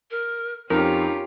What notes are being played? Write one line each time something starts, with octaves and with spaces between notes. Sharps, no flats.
A#4
F2 C#4 D#4 F4 G4 A#4